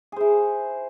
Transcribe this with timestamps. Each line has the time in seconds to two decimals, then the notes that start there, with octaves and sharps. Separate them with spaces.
0.12 G#4
0.16 C5
0.21 E4